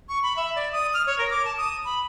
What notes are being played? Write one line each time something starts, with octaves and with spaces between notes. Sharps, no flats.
C#6
B5
E5
D5
D#6
F6
C#5
A#4
D6
A5
D#6
B5